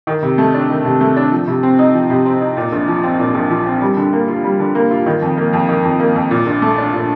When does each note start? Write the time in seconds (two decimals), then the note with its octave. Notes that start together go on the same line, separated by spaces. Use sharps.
0.07 D#3
0.22 C3
0.38 A3
0.54 D4
0.69 D#3
0.85 C3
1.01 A3
1.16 D4
1.32 F3
1.47 C3
1.63 C4
1.79 D#4
1.94 F3
2.10 C3
2.26 C4
2.41 D#4
2.57 A#2
2.72 A#1
2.87 F3
3.03 C4
3.19 A#2
3.34 A#1
3.50 F3
3.66 C4
3.81 G3
3.97 D3
4.13 A#3
4.28 F4
4.44 G3
4.60 D3
4.75 A#3
4.91 F4
5.06 D#3
5.22 F2
5.37 A#3
5.53 F2
5.69 D#3
5.85 F2
5.99 A#3
6.15 F2
6.31 A#2
6.46 A#1
6.62 A3
6.78 D4
6.93 A#2